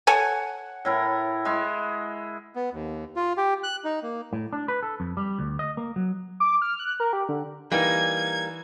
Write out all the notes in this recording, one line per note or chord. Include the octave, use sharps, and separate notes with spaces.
A4 C#5 F#5 G#5
A2 E4 A#4
G#3 E4
B3
D#2
F4
G4
F#6
D#4
A#3
A2
D4
B4
A4
F2
G3
D2
D#5
A#3
F#3
D6
F6
F#6
A#4
G4
D3
E3 G3 A#3 D#4 G#6